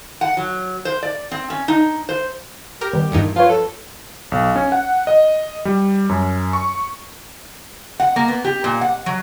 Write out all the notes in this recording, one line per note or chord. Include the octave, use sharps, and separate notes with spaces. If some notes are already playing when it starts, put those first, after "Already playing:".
F#5
F#3
C5
D5
C4
C#4
D#4
C5
G4 A#4
D#3 G3 B3
E2 G2 A#2 D#3 D#4
F3 F4 B4 C#5
A4
B1
C#4
F#5
D#5
G3
F#2
C#6
F#5
A#3
B3
G4
A#2
F#5
F#3